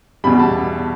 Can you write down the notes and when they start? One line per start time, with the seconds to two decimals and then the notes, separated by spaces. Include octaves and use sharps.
0.24 E2 B2 G3 B5
0.39 A5